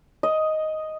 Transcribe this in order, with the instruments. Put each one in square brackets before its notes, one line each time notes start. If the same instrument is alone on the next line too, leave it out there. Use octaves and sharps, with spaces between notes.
[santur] D#5